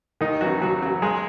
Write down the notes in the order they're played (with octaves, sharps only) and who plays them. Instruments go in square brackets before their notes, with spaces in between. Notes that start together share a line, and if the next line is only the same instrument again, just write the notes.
[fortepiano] D#2 D#3 D#4
C#3 E3 F#3 F#4
D#2 F#3 F#4
C#3 E3 F#3 F#4
B1 G#3 G#4